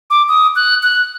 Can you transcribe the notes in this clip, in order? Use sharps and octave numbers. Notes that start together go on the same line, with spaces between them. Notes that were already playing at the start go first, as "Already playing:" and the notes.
D6
D#6
F#6
F#6